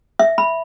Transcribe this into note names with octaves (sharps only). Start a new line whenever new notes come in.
E5
B5